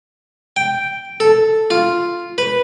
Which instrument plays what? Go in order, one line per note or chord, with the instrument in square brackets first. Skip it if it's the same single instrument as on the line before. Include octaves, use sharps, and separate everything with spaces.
[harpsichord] G5
A4
F4
B4